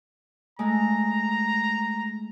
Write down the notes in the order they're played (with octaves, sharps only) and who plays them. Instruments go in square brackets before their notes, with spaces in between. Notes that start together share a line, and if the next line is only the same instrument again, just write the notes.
[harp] G#3 A3 [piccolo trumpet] A#5